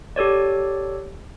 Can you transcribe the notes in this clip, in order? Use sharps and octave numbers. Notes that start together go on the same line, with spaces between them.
G4 A4 C#5 D5